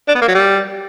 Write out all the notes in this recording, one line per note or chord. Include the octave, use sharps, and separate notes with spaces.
D4
B3
A#3
F#3
G3